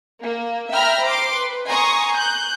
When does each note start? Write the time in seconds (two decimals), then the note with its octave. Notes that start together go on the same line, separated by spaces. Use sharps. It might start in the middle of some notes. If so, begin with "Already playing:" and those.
0.23 A#3
0.72 E5 G5 A#5 B5 F6
1.03 C5 C6 D6
1.35 B4
1.68 G#5 A#5 C6 C#6 D#6
2.15 F#6 G6